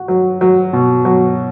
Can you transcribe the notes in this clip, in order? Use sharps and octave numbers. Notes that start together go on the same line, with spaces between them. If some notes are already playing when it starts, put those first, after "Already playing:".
Already playing: F#4
F#3
F#3
B2
F#3